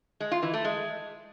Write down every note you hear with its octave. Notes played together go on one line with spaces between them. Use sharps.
G#3
F4
E3
A3
G#3